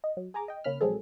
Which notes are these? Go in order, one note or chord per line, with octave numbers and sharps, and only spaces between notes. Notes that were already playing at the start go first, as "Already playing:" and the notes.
D#5
F#3
G#4 G#5 A#5 D6
D#5 G5
C#2 A#3 C#4 B5 F6
A#1 F#3 G#3 C4 G#4 A4